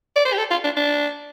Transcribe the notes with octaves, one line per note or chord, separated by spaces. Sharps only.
D5
C5
G4
A4
F4
D4
D4